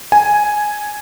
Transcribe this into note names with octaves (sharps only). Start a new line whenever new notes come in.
G#5